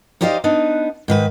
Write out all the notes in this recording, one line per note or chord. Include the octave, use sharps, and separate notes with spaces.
D#4 G4 C5 D5 D#5 F5
B3 D4 D#4
G#2 D#3 B4